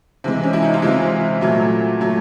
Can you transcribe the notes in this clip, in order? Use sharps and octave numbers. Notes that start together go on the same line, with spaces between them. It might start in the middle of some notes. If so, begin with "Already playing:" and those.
C3 E3 G#3
C#4
E4
D#4
F4
C3 E3 G#3 E4
A#2 F#3 A3
A#2 F#3 A3